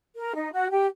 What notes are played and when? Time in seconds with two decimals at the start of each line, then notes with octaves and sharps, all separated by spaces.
0.17 A#4
0.35 D#4
0.53 F#4
0.71 G4